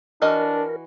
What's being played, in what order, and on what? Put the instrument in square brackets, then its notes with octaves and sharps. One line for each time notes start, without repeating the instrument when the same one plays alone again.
[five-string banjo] E3 F#4 D#5 [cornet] D4 [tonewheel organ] A#4